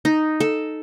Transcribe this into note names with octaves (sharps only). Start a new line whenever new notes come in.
D#4
A4